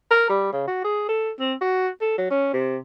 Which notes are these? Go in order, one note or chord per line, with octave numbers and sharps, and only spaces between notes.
A#4
G3
C#3
F#4
G#4
A4
C4
F#4
A4
F#3
C#4
C3